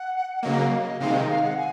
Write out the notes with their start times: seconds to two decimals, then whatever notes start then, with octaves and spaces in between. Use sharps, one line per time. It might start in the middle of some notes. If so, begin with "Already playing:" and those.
Already playing: F#5
0.43 C#3 F#3 A#3 D#5
0.61 F5
0.81 D#5
1.00 C3 D#3 G#3 F5
1.14 D#5
1.29 F5
1.43 F#5
1.57 G#5